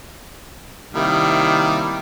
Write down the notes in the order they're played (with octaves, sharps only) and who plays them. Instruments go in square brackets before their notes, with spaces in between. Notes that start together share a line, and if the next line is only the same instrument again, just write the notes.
[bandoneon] C3 A#3 E4 [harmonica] D#3 G3